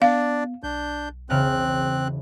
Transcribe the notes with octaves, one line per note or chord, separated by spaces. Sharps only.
B3 D4 D5 F5
B1 D4 G6
E1 C#3 C4 F6 F#6